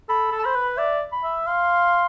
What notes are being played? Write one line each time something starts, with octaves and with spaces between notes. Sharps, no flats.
A4 B5
A4
A5
C5 B5
B4
D5 E5
B5
E5
F5 C6